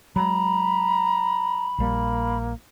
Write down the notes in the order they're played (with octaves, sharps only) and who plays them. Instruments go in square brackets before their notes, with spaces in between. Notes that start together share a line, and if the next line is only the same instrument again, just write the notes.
[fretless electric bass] F#3 G#3 [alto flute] A#5 [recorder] B5
[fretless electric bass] A#1 G3 [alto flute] A#3